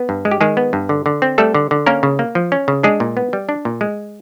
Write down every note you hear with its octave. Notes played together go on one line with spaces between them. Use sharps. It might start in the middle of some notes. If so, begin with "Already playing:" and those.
Already playing: B3
G2
G#3
G4
D#3 G#3 G#4
B3
G2
D3
D3
C4
G3 A3 A4
D3
D3
A#3 C#4 A#4
C#3
A#3
F3
C#4
C#3
G#3 D4 G#4
A#2
B3
G3
D4
A#2
G#3